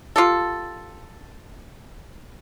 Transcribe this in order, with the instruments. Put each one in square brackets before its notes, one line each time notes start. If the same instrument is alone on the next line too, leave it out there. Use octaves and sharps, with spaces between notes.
[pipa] F4 G4 A4